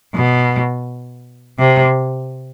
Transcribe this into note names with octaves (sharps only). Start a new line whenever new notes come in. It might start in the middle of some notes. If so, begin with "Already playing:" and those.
B2
C3